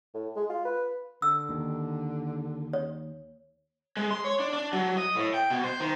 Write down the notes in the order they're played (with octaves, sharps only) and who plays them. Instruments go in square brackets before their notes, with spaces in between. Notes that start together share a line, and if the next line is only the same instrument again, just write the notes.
[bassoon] A2
G#3
F4
B4
[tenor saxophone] D3 [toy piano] E6
[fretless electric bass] D#2 D#3
[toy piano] C#5
[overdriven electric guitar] G#3
C6
C#5
D4
D4
F#3
D#5
A2
G5
B2
C5
D#3